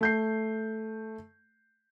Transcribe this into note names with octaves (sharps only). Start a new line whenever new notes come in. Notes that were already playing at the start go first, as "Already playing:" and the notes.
A3 G6 C7